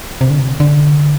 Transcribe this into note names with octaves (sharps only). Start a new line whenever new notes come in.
C3
D3
C3
D3